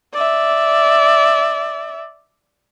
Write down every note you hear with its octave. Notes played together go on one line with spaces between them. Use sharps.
D5 E5